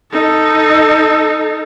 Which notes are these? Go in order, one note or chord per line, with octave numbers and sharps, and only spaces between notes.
D#4 A4